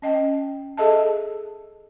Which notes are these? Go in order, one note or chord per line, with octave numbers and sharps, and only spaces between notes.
C#4 D#5 G5
G#4 A4 D#5 E5 A5